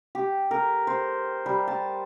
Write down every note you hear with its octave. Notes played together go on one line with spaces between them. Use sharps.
G4
A#4
C5
G3
A5